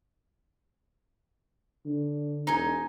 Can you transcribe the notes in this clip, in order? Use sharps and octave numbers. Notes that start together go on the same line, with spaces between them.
D3
E1 D#4 G#5